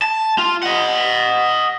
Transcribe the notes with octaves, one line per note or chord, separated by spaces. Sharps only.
A5
F4
D#5 F#5